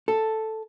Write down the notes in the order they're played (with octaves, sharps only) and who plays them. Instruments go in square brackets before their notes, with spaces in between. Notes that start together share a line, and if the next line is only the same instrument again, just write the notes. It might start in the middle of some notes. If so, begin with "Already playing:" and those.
[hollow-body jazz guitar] A4